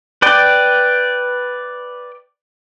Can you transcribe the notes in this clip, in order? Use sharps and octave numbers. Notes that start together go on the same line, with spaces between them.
B4 D5 G5